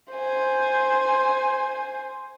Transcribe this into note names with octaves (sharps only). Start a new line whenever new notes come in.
C5 G#5